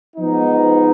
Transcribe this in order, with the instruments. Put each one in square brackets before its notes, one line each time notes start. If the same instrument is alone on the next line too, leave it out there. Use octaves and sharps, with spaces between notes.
[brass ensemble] G#2 F3 B3 D#4